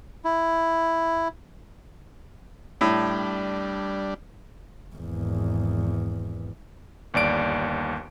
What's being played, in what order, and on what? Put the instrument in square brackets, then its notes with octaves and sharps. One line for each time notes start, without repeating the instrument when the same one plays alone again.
[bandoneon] E4
[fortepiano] A2 [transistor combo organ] G3 D4
[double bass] G#1 E2
[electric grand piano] G1 D#2 D5 D7